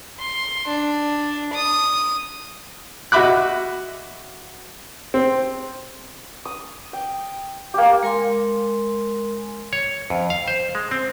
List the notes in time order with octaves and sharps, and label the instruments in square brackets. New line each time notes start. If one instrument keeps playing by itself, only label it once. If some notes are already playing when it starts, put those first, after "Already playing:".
[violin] C6
D4
D#6
[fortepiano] F#4 D#5 E5 B5 D6 F#6
C4
[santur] D#6
G5
A#3 G4
[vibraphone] G#3 A#4 G#5 C6
[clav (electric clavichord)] C#5
F2
F5
C5
G#3
C4